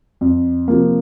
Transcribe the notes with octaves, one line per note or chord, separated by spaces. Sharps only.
F2
C3 F3 A#3